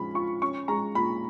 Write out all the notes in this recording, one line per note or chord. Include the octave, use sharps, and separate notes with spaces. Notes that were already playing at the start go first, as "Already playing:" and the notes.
Already playing: F3 G#3 C#4 B5
F4 C#6
C#4 C#6
G#3 A#5
A#2 B5